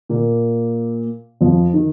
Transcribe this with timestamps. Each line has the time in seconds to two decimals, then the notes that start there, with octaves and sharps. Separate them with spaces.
0.09 A#2 A#3
1.41 F2 F3
1.74 D#3